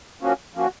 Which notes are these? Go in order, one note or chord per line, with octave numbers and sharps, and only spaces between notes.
F3 A#3 C#4 F#4
F3 A#3 C#4 F#4